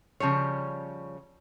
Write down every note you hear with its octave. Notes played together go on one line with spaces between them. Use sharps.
C#3 F3 G3 C#5